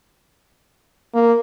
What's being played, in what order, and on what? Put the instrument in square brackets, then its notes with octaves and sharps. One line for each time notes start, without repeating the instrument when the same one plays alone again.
[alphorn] A#3